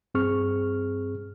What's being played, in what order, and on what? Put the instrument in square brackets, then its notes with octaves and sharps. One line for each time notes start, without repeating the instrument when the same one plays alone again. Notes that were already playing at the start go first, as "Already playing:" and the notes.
[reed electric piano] G2 C4 G#4 C#6 F6